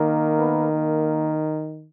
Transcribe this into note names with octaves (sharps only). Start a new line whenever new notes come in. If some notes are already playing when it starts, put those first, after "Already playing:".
Already playing: D#3 A#3
B3 B4
A#3 A#4